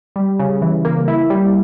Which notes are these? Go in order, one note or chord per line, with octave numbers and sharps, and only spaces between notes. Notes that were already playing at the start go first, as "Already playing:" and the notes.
G3
C#3
E3
A#3
E4
G3